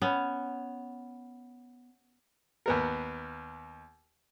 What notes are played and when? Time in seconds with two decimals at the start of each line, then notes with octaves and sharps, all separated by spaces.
0.02 B3 C#4
2.66 D#2 B3 A#4